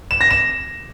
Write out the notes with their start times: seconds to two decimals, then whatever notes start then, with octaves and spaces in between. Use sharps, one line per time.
0.11 E7
0.21 A#6
0.31 E7